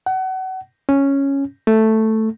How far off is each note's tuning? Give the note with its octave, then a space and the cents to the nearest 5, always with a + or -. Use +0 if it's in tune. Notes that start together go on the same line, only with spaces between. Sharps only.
F#5 +30
C#4 -5
A3 +0